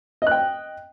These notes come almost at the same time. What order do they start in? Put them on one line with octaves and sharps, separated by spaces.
D#5 F#6 G5